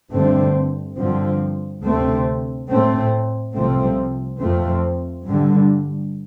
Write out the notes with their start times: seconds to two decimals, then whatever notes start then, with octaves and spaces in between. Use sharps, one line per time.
0.11 G2 D3 A3 C4
0.97 G2 D3 F3 C4
1.84 D2 C3 A3 C4
2.69 A2 A3 C4
3.55 C2 C3 F3 A3 C4
4.40 F2 F3 A3 C4
5.26 G2 D3 G3